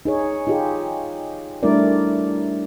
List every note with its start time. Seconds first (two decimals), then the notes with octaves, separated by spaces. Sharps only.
0.05 D#4 G#4 C#5
0.47 D#4 F4 G4 G#4
1.63 G3 A3 D4 E4 A#4 D5